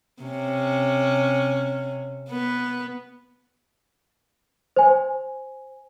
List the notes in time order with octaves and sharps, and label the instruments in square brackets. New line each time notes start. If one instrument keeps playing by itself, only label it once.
[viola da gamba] C3 C#4
B3 B4
[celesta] C5 G#5